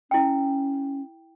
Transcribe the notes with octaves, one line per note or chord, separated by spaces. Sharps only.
C#4 E4 G5